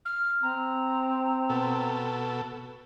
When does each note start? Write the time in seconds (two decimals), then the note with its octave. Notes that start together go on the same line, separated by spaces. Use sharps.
0.05 F6
0.43 C4 A#5
1.49 B2 A4